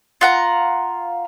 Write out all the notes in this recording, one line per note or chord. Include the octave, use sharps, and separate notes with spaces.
F4 F#5 A#5